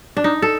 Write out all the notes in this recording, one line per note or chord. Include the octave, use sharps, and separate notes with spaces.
D4
D#4
A4